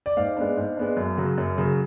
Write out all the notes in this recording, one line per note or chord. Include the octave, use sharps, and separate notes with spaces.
D5
G#2 F5
G#3 B3 D4
G#2
G#3 B3 D4
F#2
C#3 F#3
F#2
C#3 F#3